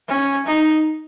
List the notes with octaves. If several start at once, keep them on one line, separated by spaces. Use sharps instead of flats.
C#4
D#4